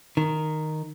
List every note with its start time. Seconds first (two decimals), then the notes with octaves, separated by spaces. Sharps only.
0.17 D#3